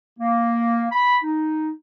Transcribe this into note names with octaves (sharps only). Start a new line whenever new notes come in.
A#3
B5
D#4